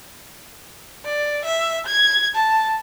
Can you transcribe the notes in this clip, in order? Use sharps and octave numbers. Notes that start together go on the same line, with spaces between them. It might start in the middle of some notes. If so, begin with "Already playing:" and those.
D5
E5
G#6
A5